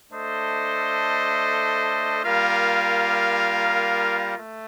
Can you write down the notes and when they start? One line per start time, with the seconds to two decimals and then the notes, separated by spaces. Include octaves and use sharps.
0.11 A3 D4 A4 C5 D#5
2.24 G3 A#3 F4 A#4 F5
4.37 A3